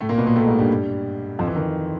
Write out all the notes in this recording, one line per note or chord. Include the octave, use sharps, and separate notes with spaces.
A2 A3
A#2 A#3
B2 B3
A#2 A#3
A2 A3
G#2 G#3
G2 G3
F2 F3
E3
D#3